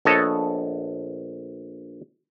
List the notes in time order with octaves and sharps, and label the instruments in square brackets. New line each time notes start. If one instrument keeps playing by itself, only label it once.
[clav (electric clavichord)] A#1 B3 A4 C#5 D#5 A5